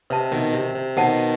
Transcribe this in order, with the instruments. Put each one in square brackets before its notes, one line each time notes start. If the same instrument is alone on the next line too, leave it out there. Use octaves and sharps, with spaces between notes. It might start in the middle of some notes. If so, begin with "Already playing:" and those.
[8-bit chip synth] C3 [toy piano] B4 E5 A5
[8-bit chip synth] B2 D#3
C3
C3
[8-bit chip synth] B2 D#3 [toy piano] C5 F#5 A5